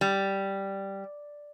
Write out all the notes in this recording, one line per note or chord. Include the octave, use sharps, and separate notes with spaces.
G3